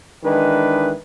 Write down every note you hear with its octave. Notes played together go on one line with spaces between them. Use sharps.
D#3 E3 G#3 D4 B4